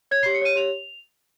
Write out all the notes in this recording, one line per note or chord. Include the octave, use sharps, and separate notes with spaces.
C#5 G#6
G4 C7
C#7
C#5 D#7
G4 F7